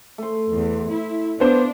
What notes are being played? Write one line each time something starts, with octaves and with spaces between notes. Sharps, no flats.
A3 C5
E2
E4
B3 D4 C5 F5 C6 D6